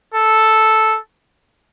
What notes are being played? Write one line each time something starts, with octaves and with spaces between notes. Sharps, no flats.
A4